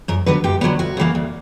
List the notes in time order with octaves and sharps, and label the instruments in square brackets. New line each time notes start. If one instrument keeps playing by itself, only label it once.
[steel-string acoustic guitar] F#2 A#4
D3 F#3 B3 B4
F#2 G4
D3 F#3 B3
D2 F#4
C#3 E3 A#3
D2